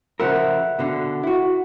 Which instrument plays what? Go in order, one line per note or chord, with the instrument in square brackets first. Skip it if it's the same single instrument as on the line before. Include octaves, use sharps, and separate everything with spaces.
[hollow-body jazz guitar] C#3 F3 A#4 [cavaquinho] E5 F#5
[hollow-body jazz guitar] B2 D3 F5
E4 F#4